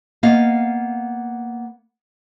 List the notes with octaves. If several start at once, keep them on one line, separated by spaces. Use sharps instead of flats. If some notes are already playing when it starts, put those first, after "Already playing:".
A#3 B3 D#5 F5